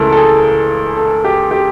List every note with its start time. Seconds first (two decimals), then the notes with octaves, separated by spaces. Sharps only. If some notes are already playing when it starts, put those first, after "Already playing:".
Already playing: C#2 C#3 E3 A3 A4 A#4
0.13 A4
0.17 G#4
0.97 A4
1.25 G4
1.51 G4